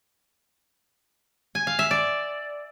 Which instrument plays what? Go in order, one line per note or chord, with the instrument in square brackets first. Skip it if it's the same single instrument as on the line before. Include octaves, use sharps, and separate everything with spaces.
[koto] G#5
F5
E5
D5